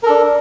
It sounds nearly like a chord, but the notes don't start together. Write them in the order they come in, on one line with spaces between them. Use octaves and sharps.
A#4 A4 D4